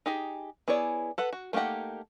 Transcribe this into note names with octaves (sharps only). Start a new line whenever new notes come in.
D#4 G4 G#4
B3 E4 G#4 C#5 D5
A4 B4 F#5
F#4
A3 A#3 D#4 G4 F#5